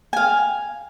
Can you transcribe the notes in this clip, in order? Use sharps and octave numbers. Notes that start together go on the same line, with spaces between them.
F5 G#5